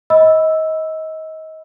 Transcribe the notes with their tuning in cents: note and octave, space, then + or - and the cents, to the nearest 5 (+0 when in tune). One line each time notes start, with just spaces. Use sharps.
D#5 +30 B5 +0 E6 +0